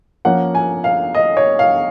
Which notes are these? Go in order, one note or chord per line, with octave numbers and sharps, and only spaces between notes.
F3 A#3 C#4 F#5
G#5
F5
D#5
C#5
F5